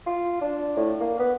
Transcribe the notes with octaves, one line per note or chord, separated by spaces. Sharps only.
F4
D4
A2
A#3
B3